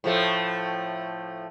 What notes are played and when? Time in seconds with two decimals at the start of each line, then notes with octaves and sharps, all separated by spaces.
0.04 A2 F3 A3